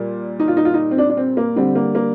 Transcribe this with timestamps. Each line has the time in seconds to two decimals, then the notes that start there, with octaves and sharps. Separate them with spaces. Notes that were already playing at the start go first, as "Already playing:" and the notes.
Already playing: A#2 G3
0.40 D#4
0.48 F4
0.57 D#4
0.65 F4
0.74 D#4
0.91 C4
0.98 D4
1.10 D4
1.17 C4
1.37 A#3
1.56 D3 G3 C4
1.75 A#3
1.95 A#3